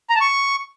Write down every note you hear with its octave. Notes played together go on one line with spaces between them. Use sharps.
A#5
A5
C#6